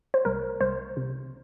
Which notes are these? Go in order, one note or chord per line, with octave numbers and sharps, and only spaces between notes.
C5
C2 A#4
C2 C5
C3